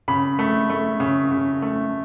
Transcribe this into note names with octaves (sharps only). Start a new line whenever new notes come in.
C#3 B5
A3
A3
C#3
C#3
A3